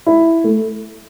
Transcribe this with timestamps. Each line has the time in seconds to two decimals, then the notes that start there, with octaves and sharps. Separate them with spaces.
0.06 E4
0.44 A3